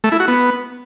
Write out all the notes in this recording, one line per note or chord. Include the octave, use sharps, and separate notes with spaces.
A3
E4
F#4
B3